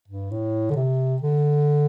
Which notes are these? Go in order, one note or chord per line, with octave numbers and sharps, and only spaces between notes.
G2
A2
D3
C3
D3